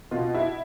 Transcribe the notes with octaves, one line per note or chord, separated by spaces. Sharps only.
B2 F4
E4